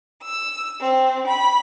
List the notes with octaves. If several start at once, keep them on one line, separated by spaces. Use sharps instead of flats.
E6
C4
B5